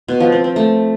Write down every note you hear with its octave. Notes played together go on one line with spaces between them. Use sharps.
B2
F3
C4
C4
A3